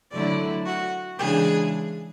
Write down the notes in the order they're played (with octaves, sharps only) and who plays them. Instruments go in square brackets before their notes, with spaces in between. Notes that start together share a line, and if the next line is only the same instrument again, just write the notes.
[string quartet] D3 F#3 A3 E4 D5
F#4
C#3 E3 G#3 D4 G#4